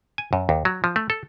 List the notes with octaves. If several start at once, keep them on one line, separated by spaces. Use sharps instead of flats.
G#5
F#2
D#2
F#3
F3
A3
A4